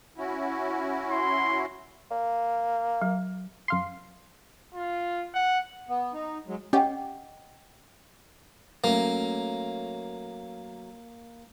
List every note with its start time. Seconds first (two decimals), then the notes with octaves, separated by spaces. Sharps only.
0.18 C#4 E4 F#4
1.11 C6
2.11 A#3
3.01 F#3
3.68 F#2 F5 C6
4.74 F4
5.34 F#5
5.89 B3
6.14 D#4
6.47 F#3 G#3
6.73 C#4 G4 D#5 F#5 G5
8.84 F#3 A3 A#3 C#4